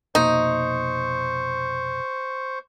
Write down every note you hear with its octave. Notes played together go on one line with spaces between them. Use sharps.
F1 B2 A#3 D#4 C5 C#6